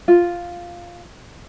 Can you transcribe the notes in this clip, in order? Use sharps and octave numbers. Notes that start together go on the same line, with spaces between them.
F4